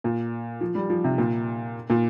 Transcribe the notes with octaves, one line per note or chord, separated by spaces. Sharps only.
A#2
F3
G3
F3
C3
A#2
A#2